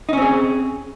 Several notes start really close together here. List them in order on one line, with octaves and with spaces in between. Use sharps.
D#4 C#4 C4 G#4